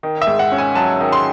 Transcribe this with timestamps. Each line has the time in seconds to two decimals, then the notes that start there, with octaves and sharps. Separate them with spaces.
0.03 D#3
0.22 E5
0.27 G#2
0.39 F#5
0.52 C#4
0.58 G#5
0.75 F#3 A5
1.01 D#3
1.12 C6